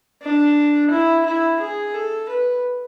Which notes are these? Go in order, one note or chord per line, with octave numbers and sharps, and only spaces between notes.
D4
E4
E4
G#4
A4
B4